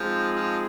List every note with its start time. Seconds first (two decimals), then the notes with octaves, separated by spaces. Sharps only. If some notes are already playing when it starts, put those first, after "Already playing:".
Already playing: F3 G#3 C4 D#4
0.35 F3